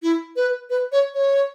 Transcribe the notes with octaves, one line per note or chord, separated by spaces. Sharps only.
E4
B4
B4
C#5
C#5